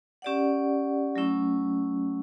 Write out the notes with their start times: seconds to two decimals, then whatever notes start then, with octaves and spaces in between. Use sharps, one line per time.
0.22 C#4 G4 D5 F#5
1.16 F#3 A3 C#4 E4